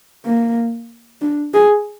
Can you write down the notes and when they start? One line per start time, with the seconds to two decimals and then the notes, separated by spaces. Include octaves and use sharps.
0.25 A#3
1.21 D4
1.54 G#4